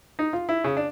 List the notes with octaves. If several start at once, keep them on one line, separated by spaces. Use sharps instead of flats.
D#4
F4
E4
C#3
D4